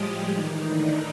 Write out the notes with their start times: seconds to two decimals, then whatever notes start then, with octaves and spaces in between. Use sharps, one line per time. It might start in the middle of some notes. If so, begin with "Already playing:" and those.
Already playing: A2 F3 G3 G#3 G4 G#4
0.33 A2 D#3 E3 D#4
0.68 D3 D4